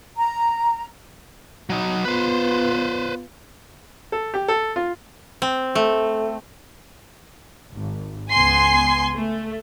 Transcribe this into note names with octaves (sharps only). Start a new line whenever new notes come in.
A#5
F#3 D#4
B3 F4 B4 C5
A4
G4
A4
F4
C4
A3
G#1
C#2 B3 G#5 C6 C7
A3